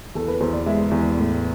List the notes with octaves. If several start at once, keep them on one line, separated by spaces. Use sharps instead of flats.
E2 A4
B4
E2 C5
D5
G#3 E5
E2
A2